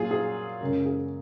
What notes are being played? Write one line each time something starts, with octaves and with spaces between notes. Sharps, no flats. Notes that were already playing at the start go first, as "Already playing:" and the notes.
Already playing: A#2 F#3 F4 G#4
G#4
F#2 C#3 G#3 A#4
G#4